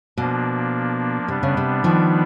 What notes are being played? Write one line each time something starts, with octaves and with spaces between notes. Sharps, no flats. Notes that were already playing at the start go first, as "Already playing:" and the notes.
B2 F3 A#3 D4
C3 G3 B3 D4
C#3
C3
D#3 F3